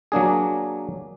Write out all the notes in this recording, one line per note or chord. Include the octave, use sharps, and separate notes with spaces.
F#3 A#3 D4 G#4